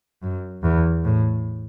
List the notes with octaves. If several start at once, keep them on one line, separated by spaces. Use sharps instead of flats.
F#2
E2
A2